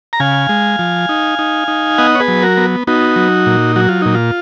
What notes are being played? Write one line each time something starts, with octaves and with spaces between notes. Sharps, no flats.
A#5
C#3 F5 G#5
G#3
F3
D#4
D#4
D#4
B3 D#5 F#5
C#5
G#4 B4
F#3
F#4 A#4
B3
B3 D#4 F#4
F#3
A#2
F#3 F#4
F4
A#2 D#4
F4